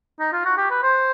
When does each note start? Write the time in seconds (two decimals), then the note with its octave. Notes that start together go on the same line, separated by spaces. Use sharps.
0.20 D#4
0.33 F4
0.45 F#4
0.57 G4
0.70 B4
0.83 C5